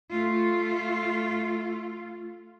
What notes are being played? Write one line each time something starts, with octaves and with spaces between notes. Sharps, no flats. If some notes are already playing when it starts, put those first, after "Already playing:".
A3 F4